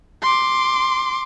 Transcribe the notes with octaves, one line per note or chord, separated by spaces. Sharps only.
C6 D6